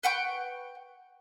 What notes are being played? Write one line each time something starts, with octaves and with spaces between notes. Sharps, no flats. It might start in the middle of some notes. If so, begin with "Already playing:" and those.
B4 F#5 G5 C#6